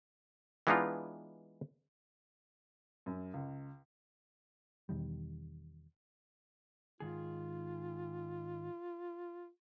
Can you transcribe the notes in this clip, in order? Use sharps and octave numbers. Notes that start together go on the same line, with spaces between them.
E3 G#3 B3 D4 D#4 F4
F#2
C#2
E2 B2 D#3 G3
G#2 D#3 F4 G#4